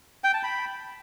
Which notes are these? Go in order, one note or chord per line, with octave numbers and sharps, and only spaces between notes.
G5
A5
B5